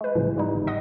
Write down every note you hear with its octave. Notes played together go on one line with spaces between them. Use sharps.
G#3 B4
C2 A2 C#3 E3 F3
G#2 G3 D#4
G1
D#5 F#5 C6 D#6